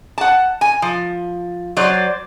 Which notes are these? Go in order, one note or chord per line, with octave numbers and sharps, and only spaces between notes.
F#5 A5
G#5
F3
F#3 C5 D5